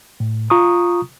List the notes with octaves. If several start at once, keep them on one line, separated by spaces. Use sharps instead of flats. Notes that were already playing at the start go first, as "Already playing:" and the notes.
A2
F4 A#5 C#6 D#6